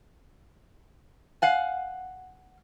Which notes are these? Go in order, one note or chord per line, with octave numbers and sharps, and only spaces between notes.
F5 F#5 G#5